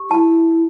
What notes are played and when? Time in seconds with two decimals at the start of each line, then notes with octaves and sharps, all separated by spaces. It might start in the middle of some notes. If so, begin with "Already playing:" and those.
Already playing: G4
0.10 E4 A5